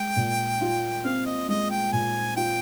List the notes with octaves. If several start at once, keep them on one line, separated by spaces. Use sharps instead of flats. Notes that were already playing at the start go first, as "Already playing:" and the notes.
Already playing: G#3 G5
A#2
F4
C4 F5
D#5
G#3 D#5
G5
A#2 G#5
F4 G5